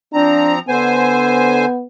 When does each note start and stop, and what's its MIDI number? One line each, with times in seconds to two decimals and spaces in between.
0.14 0.59 53
0.14 0.59 60
0.14 0.54 62
0.14 0.59 82
0.68 1.65 50
0.68 1.86 59
0.68 1.65 72
0.68 1.65 80